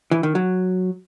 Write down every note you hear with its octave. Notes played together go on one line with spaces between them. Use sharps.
E3
D#3
F#3